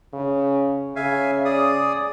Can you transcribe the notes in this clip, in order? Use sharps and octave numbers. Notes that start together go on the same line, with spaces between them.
C#3
C#3 E5 F5 G#5
G#4 D5 D#6